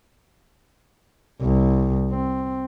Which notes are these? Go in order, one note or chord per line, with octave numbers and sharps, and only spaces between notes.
C2
C4